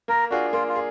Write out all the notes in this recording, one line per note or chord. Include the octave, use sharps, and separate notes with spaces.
A#3 A#4
D4 F4 F#4 G#4
A#3 F4
F4
G#4